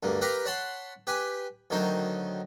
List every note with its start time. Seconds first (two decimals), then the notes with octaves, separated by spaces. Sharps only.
0.03 D2 G2 A#3
0.21 G4 A#4 B4 F5 A#5
0.46 C#5 F#5 A5 B5 C6
1.07 G4 B4 G#5
1.70 D2 D#3 F#3 D#4 C5